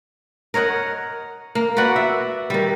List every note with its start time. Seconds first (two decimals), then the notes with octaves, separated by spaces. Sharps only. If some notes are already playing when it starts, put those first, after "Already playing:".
0.54 A#4 C#5 D#5 F#5
1.55 A#3
1.77 F#4 B4 D5 F#5
1.96 E5
2.50 D#3 G3